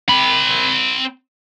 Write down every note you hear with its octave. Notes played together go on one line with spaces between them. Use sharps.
C4 B5